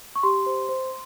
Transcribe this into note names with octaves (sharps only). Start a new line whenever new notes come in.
C#6
G4 C6
C5
C5